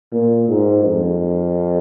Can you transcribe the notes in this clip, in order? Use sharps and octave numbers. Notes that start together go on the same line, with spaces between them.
A#2
G#2
F2